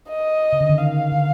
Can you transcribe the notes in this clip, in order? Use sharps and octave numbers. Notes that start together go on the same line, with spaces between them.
D#5
C#3
D3
D#3
F5
D3